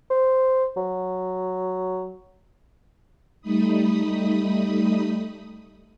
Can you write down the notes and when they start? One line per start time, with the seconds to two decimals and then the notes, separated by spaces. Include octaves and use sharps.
0.10 C5
0.77 F#3
3.41 G3 A3 D#4 B5 D#6